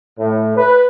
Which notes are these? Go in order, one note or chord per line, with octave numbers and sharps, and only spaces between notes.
A2
B4